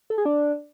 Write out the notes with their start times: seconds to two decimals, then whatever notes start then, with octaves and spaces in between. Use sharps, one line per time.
0.10 A4
0.18 G#4
0.25 D4